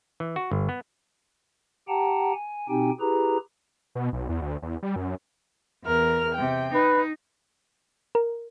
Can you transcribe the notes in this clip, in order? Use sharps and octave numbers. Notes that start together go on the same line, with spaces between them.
E3
F#4
G1
B3
G4 F#5 G5 A5 A#5
G#5
B2 C4 D#4 G4 G5 G#5
E4 G4 G#4 B4 A#5
B2
B1
E2
D2
E2
G3
F#2
E2 A#4 F6
C3 G5
D#4 B4
A#4